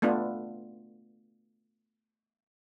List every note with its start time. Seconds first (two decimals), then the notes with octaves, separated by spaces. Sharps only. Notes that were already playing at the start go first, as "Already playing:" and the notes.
0.02 A3 B3 D4 F4